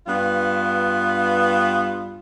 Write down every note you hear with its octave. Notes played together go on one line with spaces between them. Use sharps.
G2 B3 F4